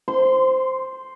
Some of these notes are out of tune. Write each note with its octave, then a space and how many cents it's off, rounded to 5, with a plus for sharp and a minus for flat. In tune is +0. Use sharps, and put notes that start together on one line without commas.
C5 +0 C6 -25